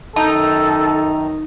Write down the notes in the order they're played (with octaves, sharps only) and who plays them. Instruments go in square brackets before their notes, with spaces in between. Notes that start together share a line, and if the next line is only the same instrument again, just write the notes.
[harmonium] F#2 D#3 A#5 [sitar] D#4 [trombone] A4 [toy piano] A5